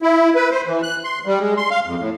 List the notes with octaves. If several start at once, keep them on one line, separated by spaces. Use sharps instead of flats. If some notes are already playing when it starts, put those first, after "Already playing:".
E4
B4
C5
E3
F#6
C6
G3
G#3
C6
F5
F2
A2